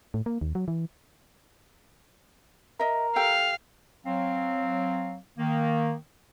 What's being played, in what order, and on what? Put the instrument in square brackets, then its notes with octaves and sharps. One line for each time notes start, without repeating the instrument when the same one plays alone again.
[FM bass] A2
A#3
D#2
F#3
E3
[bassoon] A#4 [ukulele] D#5 E5
[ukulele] G4 A4 G5 [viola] F5
[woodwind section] F#3 C4 F5
D#3 A#3